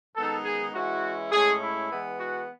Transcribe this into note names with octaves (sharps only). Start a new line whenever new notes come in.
F#2 D#3 G#3 B3 D#4 A4
G#4
E3 G#3 C#4 E4 F#4
A2 G#3 C#4 G#4
E4
E3 G#3 B3
F#4